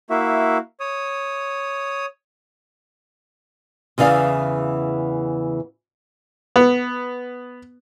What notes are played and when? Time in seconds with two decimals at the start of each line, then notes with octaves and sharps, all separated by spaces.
0.10 A#3 E4 F#4 E5
0.80 C#5 D#6
3.98 E2 C#3 E3 D5 F5
6.56 B3